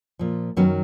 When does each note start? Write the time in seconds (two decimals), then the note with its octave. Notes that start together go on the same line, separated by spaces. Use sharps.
0.19 A#2 F3
0.57 F#2 D#3 F#3 B3 C#4